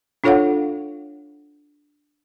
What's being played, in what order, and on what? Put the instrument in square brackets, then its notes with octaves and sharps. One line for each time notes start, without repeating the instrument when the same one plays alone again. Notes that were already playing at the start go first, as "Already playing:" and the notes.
[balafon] D4 F4 A4 C#5 F5 F#5